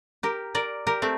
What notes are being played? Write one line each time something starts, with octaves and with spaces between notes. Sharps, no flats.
G4 A#4
A#4 D5
G4 A#4
A3 C4